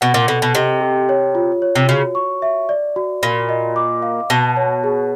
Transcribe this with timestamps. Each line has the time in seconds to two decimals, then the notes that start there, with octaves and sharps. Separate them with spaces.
0.01 B2 F#5
0.14 A#2
0.28 B2 A4
0.42 B2
0.54 C3 D#5
0.81 G4
1.09 C#5
1.35 F4
1.62 C#5
1.75 C3
1.88 C#3 F#4
2.15 C#6
2.42 E5
2.69 D5
2.96 F#4
3.23 A#2 B5
3.49 D#5
3.76 D6
4.02 F5
4.30 B2 A5
4.57 C#5
4.84 G#4